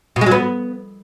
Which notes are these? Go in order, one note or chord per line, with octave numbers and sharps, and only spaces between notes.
B2
G#3
F#3
B3